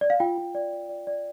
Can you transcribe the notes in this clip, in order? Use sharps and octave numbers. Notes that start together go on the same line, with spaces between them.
D5
F5
F4 G5
F4
D5
D5
D5
D5